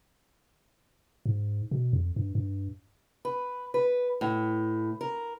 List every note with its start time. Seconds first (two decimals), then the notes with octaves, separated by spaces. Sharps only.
1.26 G#2
1.71 B2
1.93 F2
2.16 G2
2.35 G2
3.25 B4
3.74 B4
4.21 A2
5.01 A#4